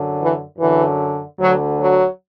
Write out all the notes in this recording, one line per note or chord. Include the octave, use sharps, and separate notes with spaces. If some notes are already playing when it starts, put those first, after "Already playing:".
Already playing: F#2 D3
E3
F#2 D3 E3
D2 D3 F#3
F#3